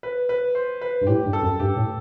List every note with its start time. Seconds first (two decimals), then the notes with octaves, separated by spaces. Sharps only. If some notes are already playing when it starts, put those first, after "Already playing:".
0.03 B4
0.29 B4
0.55 C5
0.81 B4
1.01 G2
1.07 A2 G4
1.25 G2
1.33 A4
1.42 F#2
1.59 G2 G4
1.76 A2